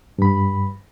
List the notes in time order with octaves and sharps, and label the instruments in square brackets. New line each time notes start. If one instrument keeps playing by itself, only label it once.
[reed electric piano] G2 B5